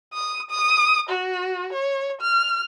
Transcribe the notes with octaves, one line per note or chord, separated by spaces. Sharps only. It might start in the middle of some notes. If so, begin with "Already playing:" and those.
D#6
D#6
F#4
C#5
F6